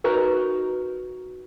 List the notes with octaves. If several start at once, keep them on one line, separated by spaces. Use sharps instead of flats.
D#4 F#4 A#4 B4